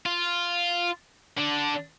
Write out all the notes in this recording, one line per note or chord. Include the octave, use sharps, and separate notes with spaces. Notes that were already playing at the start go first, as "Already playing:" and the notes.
F4
D3 D4